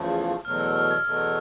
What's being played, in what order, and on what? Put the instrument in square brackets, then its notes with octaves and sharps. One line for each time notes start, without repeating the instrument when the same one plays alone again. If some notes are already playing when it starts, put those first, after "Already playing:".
Already playing: [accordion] E2 C#3 F3 A3
[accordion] E2 B2 F#3 A3 [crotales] F6
[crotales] E6
F6
G#6
[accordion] E2 B2 F#3 A3